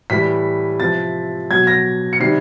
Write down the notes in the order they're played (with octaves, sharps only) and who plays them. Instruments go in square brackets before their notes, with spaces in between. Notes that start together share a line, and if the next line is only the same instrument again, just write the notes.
[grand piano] A2 E3 G3 B6
C3 F3 A6
B2 F#3 G#6
A#6
C#7
C3 D#3 G3 C7